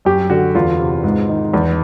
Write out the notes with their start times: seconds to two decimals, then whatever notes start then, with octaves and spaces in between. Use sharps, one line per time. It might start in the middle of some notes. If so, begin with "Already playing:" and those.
0.05 F#2 G4
0.30 D3 F#4
0.55 E2 F4
0.79 C3
1.04 G#2
1.29 D#3
1.54 E2